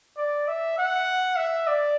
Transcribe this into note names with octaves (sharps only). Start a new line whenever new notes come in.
D5
E5
F#5
E5
D5